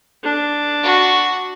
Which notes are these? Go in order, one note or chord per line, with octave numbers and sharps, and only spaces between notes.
D4
F#4